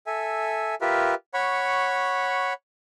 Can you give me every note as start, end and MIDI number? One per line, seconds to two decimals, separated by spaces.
0.07 0.75 69
0.07 0.75 76
0.07 0.75 80
0.81 1.14 65
0.81 1.14 67
0.81 1.14 70
0.81 1.14 71
0.81 1.14 76
1.34 2.53 73
1.34 2.53 78
1.34 2.53 83
1.34 2.53 85